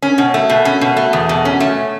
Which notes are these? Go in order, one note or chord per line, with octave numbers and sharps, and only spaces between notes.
C#4
B2
A3
B2
C#4
B2
A3
E2
B2
C#4
A3